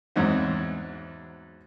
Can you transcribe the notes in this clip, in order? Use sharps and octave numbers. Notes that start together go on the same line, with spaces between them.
E2 G#2 F#3 C4 D#4